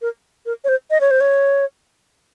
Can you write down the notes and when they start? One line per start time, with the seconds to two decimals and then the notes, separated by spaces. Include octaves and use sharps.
0.02 A#4
0.46 A#4
0.64 C#5
0.69 C5
0.90 D#5
1.01 C#5
1.11 C5
1.20 C#5